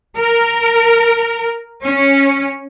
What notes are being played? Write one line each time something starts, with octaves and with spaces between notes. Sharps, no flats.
A#4
C#4